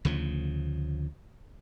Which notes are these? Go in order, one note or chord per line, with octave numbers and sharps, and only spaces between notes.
D2 C#3 F3